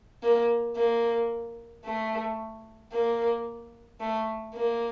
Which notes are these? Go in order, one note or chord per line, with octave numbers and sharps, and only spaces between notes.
A#3
A#3
A3
A#3
A3
A#3